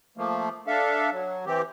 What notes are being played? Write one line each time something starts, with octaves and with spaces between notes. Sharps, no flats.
F3 A3 A#3
D4 A4 E5 F5
F#3
E3 C4 G4